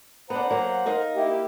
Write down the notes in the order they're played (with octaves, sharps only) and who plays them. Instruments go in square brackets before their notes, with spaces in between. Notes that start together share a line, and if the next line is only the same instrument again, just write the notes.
[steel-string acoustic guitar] B3 D4 [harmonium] C5 F#5 A#5
[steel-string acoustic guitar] F#3 A#3
D#4 A#4 F5
[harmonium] A#3 E4 G4